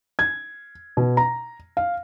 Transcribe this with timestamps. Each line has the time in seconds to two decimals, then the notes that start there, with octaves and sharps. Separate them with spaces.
0.19 G#6
0.97 B2
1.17 A#5
1.77 F5